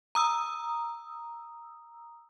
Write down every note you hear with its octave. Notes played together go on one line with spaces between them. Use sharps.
A#5 D#6 E6